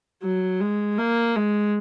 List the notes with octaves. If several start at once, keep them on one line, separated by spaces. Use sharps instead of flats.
F#3
G#3
A#3
G#3